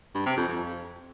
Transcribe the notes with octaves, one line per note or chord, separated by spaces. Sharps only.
G2
C3
F2
F2